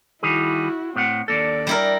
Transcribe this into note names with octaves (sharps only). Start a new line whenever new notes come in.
D#3 G3 E4 F#4 G#4
A2 C4 F#5
D#2 A#3 D4 A4 D5
G3 E4 A#4